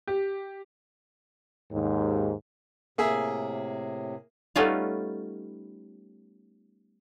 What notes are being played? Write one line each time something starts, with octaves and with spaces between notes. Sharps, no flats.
G4
D#2 G#2
A2 C3 A#3 G#4 E5
G3 A3 B3 C#4 D#4 F4